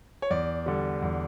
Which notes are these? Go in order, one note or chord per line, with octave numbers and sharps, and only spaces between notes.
C#5
E2 D5
D3 G3
E2